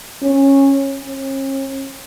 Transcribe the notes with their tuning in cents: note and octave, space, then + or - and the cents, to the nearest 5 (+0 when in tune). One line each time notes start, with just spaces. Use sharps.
C#4 -15
C#4 -40